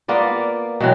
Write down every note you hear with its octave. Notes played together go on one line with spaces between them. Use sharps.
A#3 B3 F4 D5
B2 E3 F#3 C4